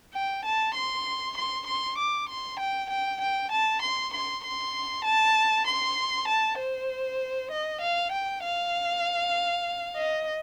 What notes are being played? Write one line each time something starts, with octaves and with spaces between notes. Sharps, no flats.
G5
A5
C6
C6
C6
D6
C6
G5
G5
G5
A5
C6
C6
C6
A5
C6
A5
C5
D#5
F5
G5
F5
D#5